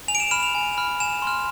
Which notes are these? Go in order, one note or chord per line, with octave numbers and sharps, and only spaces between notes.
G#5 F7
D7
E7
B5 F6 E7
F7
G#5
B5 F6
G#5 E7
C6 F6